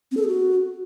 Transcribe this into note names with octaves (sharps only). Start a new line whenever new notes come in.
C4
A4
G#4
F#4